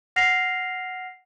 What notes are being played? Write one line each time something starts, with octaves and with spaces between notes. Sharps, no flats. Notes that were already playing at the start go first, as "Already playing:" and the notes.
F#5 F6 A#6 C7 F7